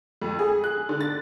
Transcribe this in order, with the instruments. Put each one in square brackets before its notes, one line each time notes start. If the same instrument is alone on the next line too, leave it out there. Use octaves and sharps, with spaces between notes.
[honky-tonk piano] F2
G#4
F#6
D3
A6